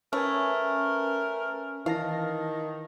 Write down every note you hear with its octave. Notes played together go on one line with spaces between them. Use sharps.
A3 C#4 A#4 B4 G#5
D#3 E3 F5 A5 A#6